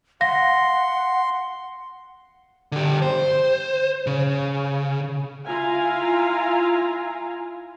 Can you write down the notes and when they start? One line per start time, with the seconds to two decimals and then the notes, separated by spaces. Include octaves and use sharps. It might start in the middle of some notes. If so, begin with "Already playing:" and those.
0.21 F5 F#5 C6 A#6
2.72 D3 G4
3.02 C5
4.07 C#3
5.47 E4 F4 F5 G#5 A#5